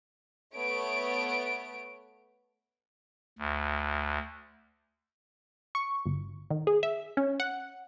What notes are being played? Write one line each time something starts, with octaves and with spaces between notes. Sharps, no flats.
A3 B3 C#5 D7
D2
C#6
G1
D#3
G#4
E5
C#4
F#5